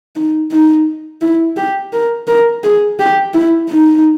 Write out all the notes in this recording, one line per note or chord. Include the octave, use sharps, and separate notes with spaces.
D#4
D#4
E4
G4
A#4
A#4
G#4
G4
E4
D#4